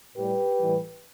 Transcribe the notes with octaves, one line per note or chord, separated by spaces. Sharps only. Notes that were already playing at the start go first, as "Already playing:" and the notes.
A2 G3 G4 B4
A2 E3 G3